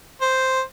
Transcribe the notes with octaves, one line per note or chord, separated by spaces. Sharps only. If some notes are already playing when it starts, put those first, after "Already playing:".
C5